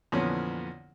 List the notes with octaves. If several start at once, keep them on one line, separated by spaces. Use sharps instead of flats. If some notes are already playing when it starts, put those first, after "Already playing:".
F2 A#2 D3 E3 B3 C#4